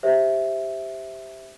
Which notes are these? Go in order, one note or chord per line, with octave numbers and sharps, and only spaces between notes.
G4 C5 E5